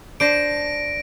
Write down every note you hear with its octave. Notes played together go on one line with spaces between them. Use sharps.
D4 C5 A#6 D7